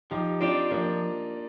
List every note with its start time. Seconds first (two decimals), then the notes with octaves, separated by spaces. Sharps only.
0.11 F3 D#4 G4
0.41 C4 D4 F4 G4
0.71 F3 A#3 D4